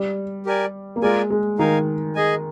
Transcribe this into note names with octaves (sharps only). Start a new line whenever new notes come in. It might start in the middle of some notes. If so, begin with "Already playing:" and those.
Already playing: G3
G4 A#4 D5 G#5
A#3
G#3 F4 A#4 D5 G#5
G#3
D#3 D#4 A#4 F5 G#5
G#4 D#5 G#5